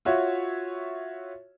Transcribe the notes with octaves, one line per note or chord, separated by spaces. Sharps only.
F4 F#4 C#5 E5